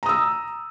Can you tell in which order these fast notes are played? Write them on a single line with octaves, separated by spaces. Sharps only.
A#5 D#6 E6